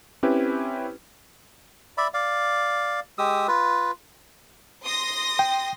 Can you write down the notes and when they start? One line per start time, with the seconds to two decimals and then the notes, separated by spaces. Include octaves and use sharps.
0.23 C4 C#4 E4 G4 B4
1.98 D5 E5 B5
2.14 D5 F5
3.18 G#3 G4 D#6 E6
3.48 F4 B4
4.84 C6 D#6 A#6
5.39 G5